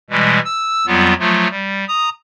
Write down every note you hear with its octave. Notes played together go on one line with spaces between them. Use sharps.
B2 E3 G3 G#3
E6
F2 F#3 G3 B3 F4
F3 F#3 A3 F4
G3
A#5 D#6